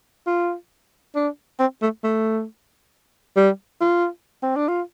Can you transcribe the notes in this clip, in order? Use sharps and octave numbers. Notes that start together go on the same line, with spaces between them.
F4
D4
C4
A3
A3
G3
F4
C4
D4
F4